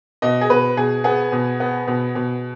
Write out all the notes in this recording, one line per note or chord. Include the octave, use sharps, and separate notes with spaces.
B2 D#5
G#4
B2 B4
B2 G#4
B3 G#4
B2
B3
B2
B2